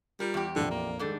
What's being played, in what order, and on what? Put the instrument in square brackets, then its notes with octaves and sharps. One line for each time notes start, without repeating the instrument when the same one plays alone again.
[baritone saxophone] G3 [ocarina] F4 [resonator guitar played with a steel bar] A#4
[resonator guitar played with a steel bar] E2 G4
[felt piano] A#1 F2 [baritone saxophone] D3 [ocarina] D5
[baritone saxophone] A#3
[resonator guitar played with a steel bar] G#2 G3 D4 [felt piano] D#3 G#3 [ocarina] A4